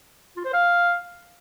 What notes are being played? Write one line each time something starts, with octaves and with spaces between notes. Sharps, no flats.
F4
C5
F5